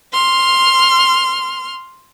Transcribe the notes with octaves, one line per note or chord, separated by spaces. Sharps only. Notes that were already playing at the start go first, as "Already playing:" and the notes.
C6 F6